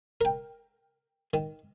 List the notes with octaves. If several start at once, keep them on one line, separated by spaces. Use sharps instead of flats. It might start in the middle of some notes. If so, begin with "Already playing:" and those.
A#4 G5
D#3